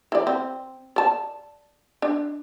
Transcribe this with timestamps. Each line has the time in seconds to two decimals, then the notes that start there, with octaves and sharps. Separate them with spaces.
0.12 E3 D5
0.27 C4
0.96 D5 A5
2.02 D4